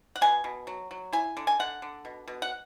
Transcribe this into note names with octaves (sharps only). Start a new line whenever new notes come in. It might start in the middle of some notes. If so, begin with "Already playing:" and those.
F#5
B2 G#5
B2
F#3
F#3
E4 G#5
D3
G#5
D3 F#5
D3
B2
B2
F#5